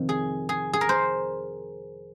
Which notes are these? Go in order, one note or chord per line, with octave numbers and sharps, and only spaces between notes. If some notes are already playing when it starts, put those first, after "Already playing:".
Already playing: F2 C3 D#3
G#4
G#4
G#4
A#4
C5